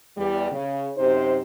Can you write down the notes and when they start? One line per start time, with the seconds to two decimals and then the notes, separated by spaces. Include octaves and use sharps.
0.17 E2 G3
0.51 C#3
0.97 F#2 C3 D#4 C5